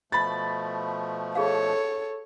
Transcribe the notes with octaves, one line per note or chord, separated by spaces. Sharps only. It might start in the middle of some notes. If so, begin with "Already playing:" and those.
B2 F3 A3 B5 A6
F4 G#4 A4 C#5 F5